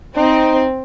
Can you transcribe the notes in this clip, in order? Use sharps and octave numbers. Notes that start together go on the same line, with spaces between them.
C4 D#4